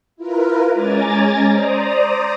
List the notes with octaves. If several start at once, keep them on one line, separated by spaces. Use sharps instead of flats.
E4 F4 A#4 B4
G#3 C#4 G#5 A#5 D6 A6
C5 D5 A#5 D#6